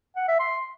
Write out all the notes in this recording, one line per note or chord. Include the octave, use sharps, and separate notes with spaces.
F#5
E5
C6